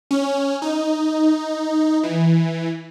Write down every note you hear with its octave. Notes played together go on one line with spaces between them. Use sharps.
C#4
D#4
E3